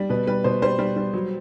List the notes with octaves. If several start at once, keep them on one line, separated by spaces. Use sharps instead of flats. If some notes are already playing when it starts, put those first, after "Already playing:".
Already playing: G3
B2 B4
G3 B4
B2 C5
G3 C5
G3
G3
F#3